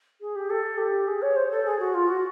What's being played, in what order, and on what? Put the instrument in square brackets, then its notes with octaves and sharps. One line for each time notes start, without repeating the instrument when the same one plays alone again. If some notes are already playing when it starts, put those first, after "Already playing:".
[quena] G#4
G4
A4
G4
G#4
C#5
C5
A4
G#4
F#4
F4
F#4